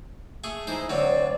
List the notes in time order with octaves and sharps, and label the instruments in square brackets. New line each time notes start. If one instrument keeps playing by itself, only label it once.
[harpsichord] A3 G#4
[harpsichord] E3 G#3 C5 [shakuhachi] D#4
[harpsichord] D2 F#3 C4 [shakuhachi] D5